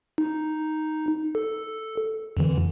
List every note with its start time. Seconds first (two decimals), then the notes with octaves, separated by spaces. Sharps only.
0.18 D#4
1.35 A4
2.37 F2 D3 E3